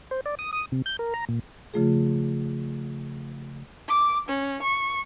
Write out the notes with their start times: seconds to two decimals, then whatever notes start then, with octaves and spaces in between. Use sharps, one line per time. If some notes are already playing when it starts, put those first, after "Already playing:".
0.11 C5
0.26 D5
0.39 D#6
0.53 D#6
0.72 C3
0.86 G6
0.99 A#4
1.14 A#5
1.29 A#2
1.74 C#3 F3 A3 F4 G#4
3.89 D6
4.28 C#4
4.62 C#6